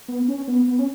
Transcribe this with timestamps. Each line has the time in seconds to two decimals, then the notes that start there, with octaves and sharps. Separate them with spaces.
0.08 B3
0.28 C#4
0.48 B3
0.68 B3
0.79 C#4